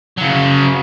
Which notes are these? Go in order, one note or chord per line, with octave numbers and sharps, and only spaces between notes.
C#3 F#3